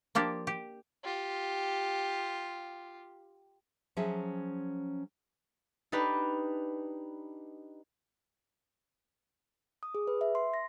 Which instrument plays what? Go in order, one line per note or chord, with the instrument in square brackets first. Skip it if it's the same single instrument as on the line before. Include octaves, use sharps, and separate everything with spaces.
[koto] F3 A#3 D4 G4
G4
[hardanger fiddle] F4 G4
[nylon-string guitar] F3 F#3 C#4 G#4 E5
[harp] D4 D#4 G4 B4
[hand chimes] D#6
G#4
B4
E5
C6
A#6